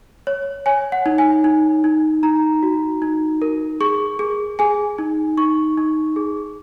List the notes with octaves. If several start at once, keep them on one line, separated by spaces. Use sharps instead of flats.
C#5
C#5 G#5
F#5
D#4
G#5
D#4
D#4
D#4 A#5
F#4
D#4
A#4
G#4 C#6
G#4
G#4 G#5
D#4
D#4 C#6
D#4
G#4